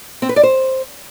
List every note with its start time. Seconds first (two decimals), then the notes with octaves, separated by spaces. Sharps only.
0.22 C4
0.29 B4
0.36 D5
0.43 C5